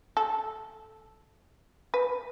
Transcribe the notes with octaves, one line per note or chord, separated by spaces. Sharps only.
A4
B4